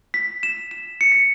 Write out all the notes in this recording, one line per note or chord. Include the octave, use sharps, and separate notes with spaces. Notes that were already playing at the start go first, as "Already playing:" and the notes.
B6
E7
E7
C#7
B6